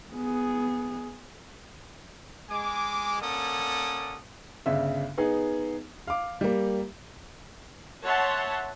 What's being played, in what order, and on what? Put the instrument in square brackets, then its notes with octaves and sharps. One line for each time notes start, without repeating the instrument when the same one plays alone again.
[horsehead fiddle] B3 G#4
[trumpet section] G#3 G#5 D6
A#3 C#4 A4 D5 F#5 D#6
[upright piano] G1 C#3 E5
B3 D#4 G#4
F5 D6
G3 A#3
[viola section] C#5 E5 F#5 A5 C6